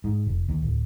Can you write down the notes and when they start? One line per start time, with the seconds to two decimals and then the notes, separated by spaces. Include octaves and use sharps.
0.04 G#2
0.27 F1
0.49 D#2
0.62 D1